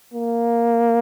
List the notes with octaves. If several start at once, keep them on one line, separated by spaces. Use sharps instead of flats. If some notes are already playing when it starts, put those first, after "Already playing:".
A#3